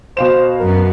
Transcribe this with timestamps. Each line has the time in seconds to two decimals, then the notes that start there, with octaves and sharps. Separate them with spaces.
0.17 B2 C5 F5 E7
0.60 F#2 B3 A#4